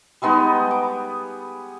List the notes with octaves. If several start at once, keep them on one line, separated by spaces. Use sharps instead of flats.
G3 G#3 B3 D#4
D6